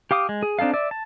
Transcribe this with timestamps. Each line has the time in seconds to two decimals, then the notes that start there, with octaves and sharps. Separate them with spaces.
0.11 G4 F5 D6 D#6
0.29 G#3
0.43 G#4
0.59 C4 D4 D#4 A4 F5
0.74 D5 E5
0.91 A5